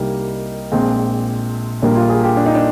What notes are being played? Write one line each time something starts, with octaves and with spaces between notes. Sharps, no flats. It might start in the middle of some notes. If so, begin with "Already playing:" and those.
Already playing: C2 C3 G3 A#3 D#4
A#1 A#2 G#3 C4
A#1 A#2 G3 A#3 D4
F4
G#4
G4
D4
D#4
D4